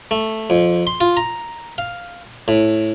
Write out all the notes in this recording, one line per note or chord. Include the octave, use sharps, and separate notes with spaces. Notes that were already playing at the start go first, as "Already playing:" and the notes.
A3
F2
C6
F4
A#5
F5
A2